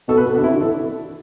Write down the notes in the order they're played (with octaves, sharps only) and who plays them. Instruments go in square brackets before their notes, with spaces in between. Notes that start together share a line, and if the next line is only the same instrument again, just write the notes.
[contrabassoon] B2 [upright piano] A4
[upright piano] B4
[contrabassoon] B2 [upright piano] A4
[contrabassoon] D3 [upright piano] F#4
[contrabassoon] C3 [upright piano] E4
[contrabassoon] D3 [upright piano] F#4
[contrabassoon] E3 [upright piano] A4